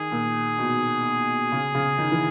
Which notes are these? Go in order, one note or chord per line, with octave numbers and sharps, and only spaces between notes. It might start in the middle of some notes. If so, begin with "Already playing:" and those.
Already playing: D#3 G#4
A#2
B2
C#3
C#3
D#3
E3